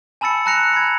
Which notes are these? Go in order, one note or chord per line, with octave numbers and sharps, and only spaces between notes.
G#5 A5 B5 E6 A6 C#7
A5 A#5 F#6 A#6 C#7 F7
B5 G#6